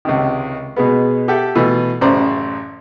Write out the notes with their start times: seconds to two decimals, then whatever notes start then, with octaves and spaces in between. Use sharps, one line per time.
0.05 C#2 C3 D#3
0.76 B2 G#3 B3
1.28 G4 A4 E5 F#5 G5
1.55 B2 E3 A3
2.01 A1 F#2 C#3 C5 D5 A#5